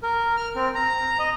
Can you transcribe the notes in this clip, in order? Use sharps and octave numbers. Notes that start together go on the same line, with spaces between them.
A#4
F6
C4
A#5
D#5